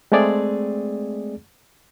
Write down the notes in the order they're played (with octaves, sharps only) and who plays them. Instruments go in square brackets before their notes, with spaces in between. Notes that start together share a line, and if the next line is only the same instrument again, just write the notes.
[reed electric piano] G#3 A3 C4 G#4 D5